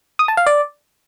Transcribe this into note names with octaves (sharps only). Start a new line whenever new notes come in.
D#6
A5
F5
D5